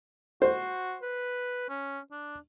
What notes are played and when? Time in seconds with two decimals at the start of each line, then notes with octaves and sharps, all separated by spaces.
0.42 F#4 C5
1.02 B4
1.69 C#4
2.11 D4